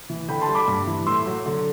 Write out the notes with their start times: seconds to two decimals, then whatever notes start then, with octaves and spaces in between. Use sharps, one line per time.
0.10 E3
0.28 D3 G5 B5
0.42 A5 C6
0.48 G3
0.55 B5 D6
0.68 G2
0.87 E3
1.06 A2 C6 E6
1.26 F#3
1.46 D3